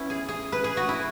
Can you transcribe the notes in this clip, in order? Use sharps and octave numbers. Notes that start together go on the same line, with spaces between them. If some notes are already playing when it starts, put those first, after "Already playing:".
Already playing: B3 C#4 E4
G#4
G#4
B4
G#4
F#4
E4